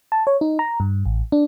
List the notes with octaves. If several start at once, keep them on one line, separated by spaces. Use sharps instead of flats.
A5
C#5
D#4
A#5
G2
A1
D4